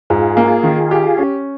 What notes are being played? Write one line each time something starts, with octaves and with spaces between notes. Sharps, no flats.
G#2 F4 G#4
A#3
D#3
G4
C#4